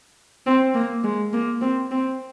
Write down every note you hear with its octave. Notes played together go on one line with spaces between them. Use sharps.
C4
A#3
G#3
A#3
C4
C4